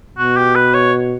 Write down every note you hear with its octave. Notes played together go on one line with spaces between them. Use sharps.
B2 F#4
G4
B4
C#5